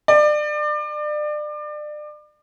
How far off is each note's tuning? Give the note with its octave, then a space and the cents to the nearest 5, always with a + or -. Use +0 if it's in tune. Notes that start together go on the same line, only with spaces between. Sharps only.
D5 +30